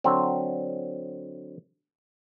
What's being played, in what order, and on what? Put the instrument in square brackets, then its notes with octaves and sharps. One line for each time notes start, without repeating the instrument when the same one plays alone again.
[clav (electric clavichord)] D3 F#3 C4